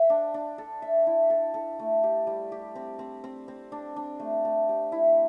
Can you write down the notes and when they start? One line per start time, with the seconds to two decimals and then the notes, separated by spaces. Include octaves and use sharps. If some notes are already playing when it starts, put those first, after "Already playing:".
Already playing: C5 E5
0.10 D4
0.34 D4
0.58 A4
0.82 E5
1.07 E4
1.30 A4
1.54 A4
1.79 A3
2.04 G4
2.27 G3
2.52 G4
2.75 C4
2.99 C4
3.24 C4
3.48 C4
3.72 D4
3.96 D4
4.20 A3
4.45 A3
4.69 G4
4.92 E4